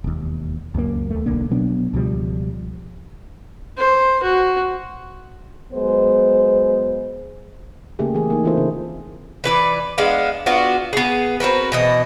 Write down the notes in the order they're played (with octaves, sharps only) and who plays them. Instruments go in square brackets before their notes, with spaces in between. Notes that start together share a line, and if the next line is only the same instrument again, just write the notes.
[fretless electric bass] E1 D#2
C#2 F#2 F#3 A#3
D#2 A3
D1 B1 D3 A#3
B2 F#3 B3 D4
C#2 B2 F3 G3
[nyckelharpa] C5
F#4
[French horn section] F#3 G#3 B3 C5
[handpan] C#3 A3 A#3 G4 G#4
E3 G#4
A#3 D#4
E3 C4 E4 F4 A4 C5
C#3
[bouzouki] E3 B4 D5
G#3 B3 D4 F5
B3 D4 F4 F#4
B3 G#4
C4 F#4 A#4 B4
B2 E3 D#5